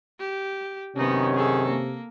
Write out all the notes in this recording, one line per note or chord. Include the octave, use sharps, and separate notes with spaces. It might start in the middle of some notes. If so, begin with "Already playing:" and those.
G4
F#2 C3 D#3 B3 C#4 D#4
G#4 A4
A#3